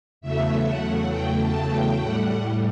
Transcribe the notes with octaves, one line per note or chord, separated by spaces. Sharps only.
E2 C#3 F#3 A3 E5
F#5
G5
A5
G5
A2 G3 F#5